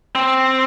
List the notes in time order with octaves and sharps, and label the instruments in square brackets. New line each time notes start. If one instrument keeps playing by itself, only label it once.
[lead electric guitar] C4